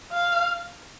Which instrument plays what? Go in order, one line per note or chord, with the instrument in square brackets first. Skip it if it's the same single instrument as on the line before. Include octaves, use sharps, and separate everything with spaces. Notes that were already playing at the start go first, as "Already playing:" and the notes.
[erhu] F5